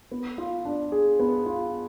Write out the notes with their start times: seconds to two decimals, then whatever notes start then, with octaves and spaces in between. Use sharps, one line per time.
0.11 B3
0.38 F4
0.65 D4
0.92 G#4
1.20 B3
1.46 F4